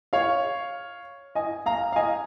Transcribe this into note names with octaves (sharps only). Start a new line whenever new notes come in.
C#5 F5
D#5 G#5
F5 A#5
F5
D#5 G#5